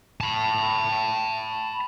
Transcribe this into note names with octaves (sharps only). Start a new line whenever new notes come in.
A5 B5